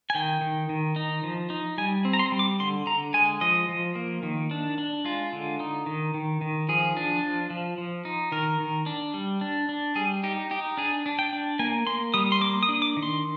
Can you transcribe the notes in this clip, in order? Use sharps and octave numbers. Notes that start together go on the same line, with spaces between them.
G#5
D#3 G5
D#3
D#3
D#4
F3
D#4
G3 G#5
C4
A#5
C6
G3
D6
D3 C6
D3 A#5
G#3 G#5
F3 D#5
F3
A#3
D#3
D4
D4
G#3 F4
D3
D#4
D#3
D#3
D#3
F3 G#4
D4
F3
F3
F3
D#4
D#3 A#4
D#3
D4
G3
D4
D4
G3 G#4
D#4 G4
D#4 G4
D4 G#4
D4
G5
D4
A#3 G#5
A#3 C6
G3 D#6
C6
A#3 D6
D#6
D4
D6
D#3
C6